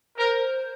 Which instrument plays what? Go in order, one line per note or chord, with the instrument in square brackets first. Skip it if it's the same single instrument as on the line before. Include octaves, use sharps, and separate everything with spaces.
[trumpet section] A#4 [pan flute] C5